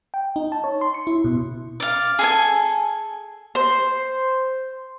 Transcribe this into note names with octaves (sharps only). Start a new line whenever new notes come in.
G5
D#4
A5
C#5
C6
C#7
E4
B2
D5 F5
G#4 A4 G#5
C5